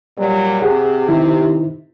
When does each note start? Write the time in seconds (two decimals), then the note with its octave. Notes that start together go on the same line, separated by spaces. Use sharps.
0.17 A#2 F#3 G3
0.62 C3 G4 G#4 F#5
1.08 D#3 D#4 E4